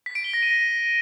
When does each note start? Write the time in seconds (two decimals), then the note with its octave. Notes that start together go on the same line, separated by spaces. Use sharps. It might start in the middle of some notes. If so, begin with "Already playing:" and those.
0.06 B6
0.15 D7
0.24 G7
0.34 A#6
0.43 D#7